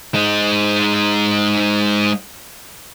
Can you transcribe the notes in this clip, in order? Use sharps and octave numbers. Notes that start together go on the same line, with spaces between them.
G#3 D#4